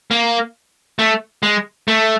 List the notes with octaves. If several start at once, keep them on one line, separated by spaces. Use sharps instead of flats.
A#3
A3
G#3
A3